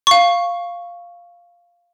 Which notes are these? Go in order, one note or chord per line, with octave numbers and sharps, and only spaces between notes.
F5 C#6